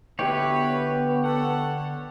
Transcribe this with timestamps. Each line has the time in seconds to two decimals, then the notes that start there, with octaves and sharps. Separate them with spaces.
0.19 D3 B3 E4 G4 B4 C#5
1.24 A4 F#5